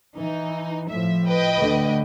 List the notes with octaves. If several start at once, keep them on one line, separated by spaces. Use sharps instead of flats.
E3 D#4
A2 F3 E5
B4 D#5 G5
D2 D3 A3